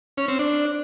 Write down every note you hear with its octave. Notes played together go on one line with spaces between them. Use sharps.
C#4
C4
D4